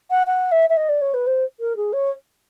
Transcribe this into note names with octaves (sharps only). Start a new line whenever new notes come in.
F#5
F#5
E5
E5
D#5
D5
C#5
B4
C5
A#4
G#4
C#5